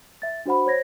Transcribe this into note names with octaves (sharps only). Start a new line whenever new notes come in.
E5 A6
D4 F#4 C5 F#5 B5
C5 C#5 G#6 A#6